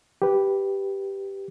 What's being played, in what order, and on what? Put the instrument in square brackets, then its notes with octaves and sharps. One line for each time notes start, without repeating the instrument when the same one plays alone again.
[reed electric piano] G4 B4